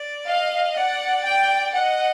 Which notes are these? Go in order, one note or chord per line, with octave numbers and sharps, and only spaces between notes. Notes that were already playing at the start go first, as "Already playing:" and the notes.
Already playing: D5
D#5 F5
D5 F#5
G5
D#5 F#5